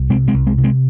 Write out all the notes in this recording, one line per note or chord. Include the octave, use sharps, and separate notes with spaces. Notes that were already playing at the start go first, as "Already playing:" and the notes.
Already playing: C2
C3 G#3 C4
G#3 C4
C2
G#3 C4
C3
G#3 C4